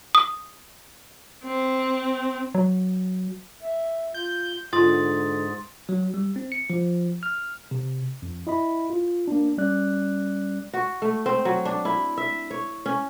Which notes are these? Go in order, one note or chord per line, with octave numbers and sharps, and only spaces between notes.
D#6
C4
F#3
E5
F4 G6
G#2 D3 F4 C6 D#6 A6
F#3
G3
C4
C#7
F3
F6
C3
F2
E4 D#5 B5
F4
A#3 D4
G3 C#4 D5 F#6
F#4
A3
C4
F#3
D4
E4
E5
C#5
C#4